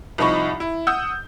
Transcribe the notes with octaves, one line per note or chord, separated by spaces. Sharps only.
C2 F3 D#4 B5 C#6
E4
F#5 D#6 E6 G6